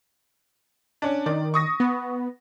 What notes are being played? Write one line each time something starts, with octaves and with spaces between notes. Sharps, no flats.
C#4 D4
D#3 D5
C#6 D#6 A#6
B3